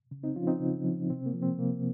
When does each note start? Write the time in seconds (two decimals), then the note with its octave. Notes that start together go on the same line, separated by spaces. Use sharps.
0.11 C#3
0.23 C4 D#4
0.35 F3 C#4 F4
0.47 C4 D#4
0.60 C#3
0.85 F3
1.10 C3 C4
1.26 A#3
1.34 F3
1.42 C4
1.58 C3 A#3